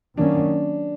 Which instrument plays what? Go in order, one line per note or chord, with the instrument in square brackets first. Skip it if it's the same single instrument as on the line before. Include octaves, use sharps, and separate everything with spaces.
[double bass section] D#3 F#3 A#3 C#4 [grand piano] D4